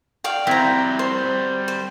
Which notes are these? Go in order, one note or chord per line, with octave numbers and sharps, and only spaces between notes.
D5 F5 G5
G3 C4 E4 F#4 A#5
C5
C5